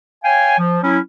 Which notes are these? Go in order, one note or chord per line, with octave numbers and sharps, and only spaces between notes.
C#5 F5 G5 G#5
F3
F#3 C#4 E4